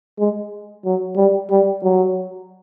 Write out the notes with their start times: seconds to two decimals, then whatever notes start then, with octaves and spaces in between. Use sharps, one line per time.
0.19 G#3
0.85 F#3
1.17 G3
1.50 G3
1.83 F#3